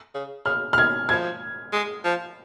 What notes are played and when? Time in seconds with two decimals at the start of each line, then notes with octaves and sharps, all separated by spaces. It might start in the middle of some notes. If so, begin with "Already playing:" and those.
0.14 C#3
0.46 C#3 F6
0.73 F6
0.77 D#3 G#6
1.09 F3 G#6
1.73 G#3
2.04 F3